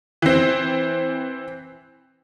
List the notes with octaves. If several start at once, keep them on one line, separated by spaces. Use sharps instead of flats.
E3 C4